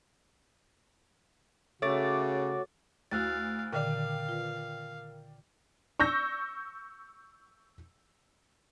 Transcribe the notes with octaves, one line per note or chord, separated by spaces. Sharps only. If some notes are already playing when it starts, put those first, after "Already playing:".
C#3 A3 F#4 C#5 D6 A6
D2 E4 F#4 F5 E6 F#6 A6
A#2 D3 D#3 A#4 D5 F5 G5
F4 B4
C#6 E6 G6 A#6